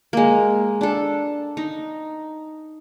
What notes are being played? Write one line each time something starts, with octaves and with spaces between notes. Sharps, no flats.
G#3 A#3
D4 A4
D#4